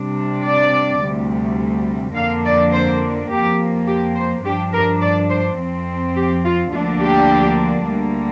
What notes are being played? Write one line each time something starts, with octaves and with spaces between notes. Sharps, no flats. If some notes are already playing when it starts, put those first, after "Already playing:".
Already playing: C3 G3 D4
D5
D2 C3 G3
F2 D3 A#3 D4 F5
D5
C5
F2 F3 A#3 G4
G4
C5
G2 F3 D4 G4
A#4
D5
C5
F2 F3 C4
G4
F4
D2 D3 F3 A#3 D4 F4
G4
D2 D3 G3 A#3